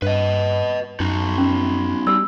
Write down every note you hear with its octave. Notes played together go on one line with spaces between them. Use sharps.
G2 B4 D#5
F#2 D#4 F#4
C#4
G3 G4 E6